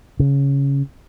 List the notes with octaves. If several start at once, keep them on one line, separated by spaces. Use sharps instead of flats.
C#3